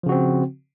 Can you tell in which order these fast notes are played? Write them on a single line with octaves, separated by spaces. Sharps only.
F3 C#3 F#4 C4